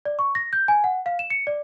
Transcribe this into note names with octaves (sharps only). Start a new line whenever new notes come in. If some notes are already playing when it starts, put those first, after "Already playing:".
D5
C#6
A#6
G6
G#5
F#5
F5
E7
C#7
D5